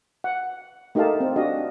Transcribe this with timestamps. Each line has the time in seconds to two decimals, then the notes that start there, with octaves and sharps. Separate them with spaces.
0.24 F#5
0.95 A3 D#4 G4 A#4 F5 A5
1.20 C4
1.36 D4 F#4 G4 D#5 F5